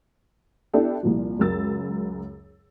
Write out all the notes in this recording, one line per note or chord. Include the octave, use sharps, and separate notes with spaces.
B3 D4 E4 G4 A4
C2 A#2 F3
C#2 F#2 A#4 E6 A6